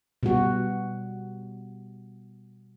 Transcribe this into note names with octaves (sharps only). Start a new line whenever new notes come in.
B2 G3 F#4